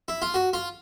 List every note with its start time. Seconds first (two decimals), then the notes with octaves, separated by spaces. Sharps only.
0.08 E4
0.22 F4
0.34 F#4
0.53 F4